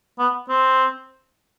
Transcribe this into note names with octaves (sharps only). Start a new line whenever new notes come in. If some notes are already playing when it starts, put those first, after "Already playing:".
B3
C4